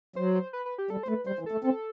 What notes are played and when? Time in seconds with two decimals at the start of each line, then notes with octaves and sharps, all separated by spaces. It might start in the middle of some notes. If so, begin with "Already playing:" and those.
0.16 F#3 C5
0.35 C5
0.53 B4
0.66 B4
0.78 G4
0.90 G3 A4
1.03 C5
1.08 A3 B4
1.26 G3 C5
1.39 E3
1.46 A4
1.51 A3
1.64 C4 A4